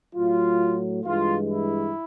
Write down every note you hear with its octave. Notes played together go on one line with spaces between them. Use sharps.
A2 F#3 A3 F4
G2 E3 G#3 F4
E4